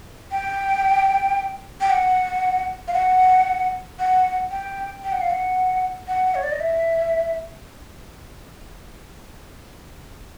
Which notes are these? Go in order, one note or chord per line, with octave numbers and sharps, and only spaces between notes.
G5
G5
F#5
F5
F#5
F#5
G5
G5
F#5
F5
F#5
F#5
C#5
D5
D#5
E5